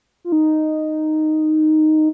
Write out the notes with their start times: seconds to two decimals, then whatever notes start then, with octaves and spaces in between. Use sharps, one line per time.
0.24 F4
0.32 D#4